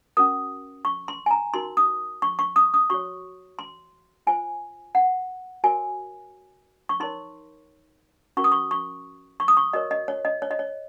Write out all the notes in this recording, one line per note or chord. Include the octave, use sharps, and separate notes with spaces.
C#4 F#4 A#4 D#6
C#6
C6
G#5
A#5
D#4 F#4 A#4 C6
D#6
C#6
C#6
D#6
D#6
F#4 C#5 C#6
C6
F4 C5 G#5
F#5
F#4 A#4 C#5 G#5
C#6
D#4 A#4 C#5 C6
C#4 F#4 A#4 C#6
D#6
C#6
C#6
C#6
D#6
C#6
F#4 A#4 C#5 D#5
D#5
C#5
D#5
C#5
D#5
C#5